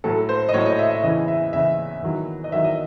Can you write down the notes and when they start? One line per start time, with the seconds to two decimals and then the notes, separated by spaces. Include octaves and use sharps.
0.04 A2 F#3 A4
0.29 C5
0.49 D#5
0.54 A2 F#3 C#5
0.66 D#5
0.79 E5
0.90 E5
1.03 E2 C#3 E3 D#5
1.28 E5
1.53 E2 C#3 E3 E5
2.02 E2 D#3 F#3
2.44 D#5
2.52 E2 D#3 F#3 E5
2.64 D#5